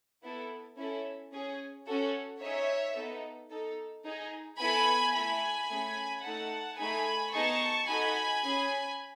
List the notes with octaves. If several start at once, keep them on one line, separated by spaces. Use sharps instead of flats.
B3 E4 A4
C#4 E4 A4
C#4 G#4
C#4 F#4 A4
D#4 G#4 C#5 E5
B3 D#4 A4
D#4 A4
D#4 G#4
B3 E4 A4 G#5 B5
A3 E4 A4 G#5 B5
A3 C#4 G#4
A3 D#4 A4 F#5 A5
A3 D#4 G#4 G#5 B5
B3 D#4 G#4 A5 C#6
D#4 F#4 A4 G#5 B5
C#4 G#4